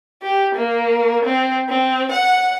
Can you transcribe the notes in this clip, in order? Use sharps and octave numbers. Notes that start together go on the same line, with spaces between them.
G4
A#3
C4
C4
F#5